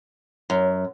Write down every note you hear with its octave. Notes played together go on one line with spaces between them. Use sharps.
F#2